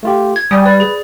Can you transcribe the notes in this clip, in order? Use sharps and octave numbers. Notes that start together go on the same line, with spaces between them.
A3 F4 G4
G#6
G3 D5 G#5 D#6
B4 D5
G#4